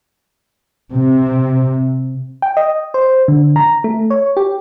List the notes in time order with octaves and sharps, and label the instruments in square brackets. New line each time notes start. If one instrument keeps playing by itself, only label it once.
[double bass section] C3
[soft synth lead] G5
D#5
C5
D3
A#5
A3
C#5
G4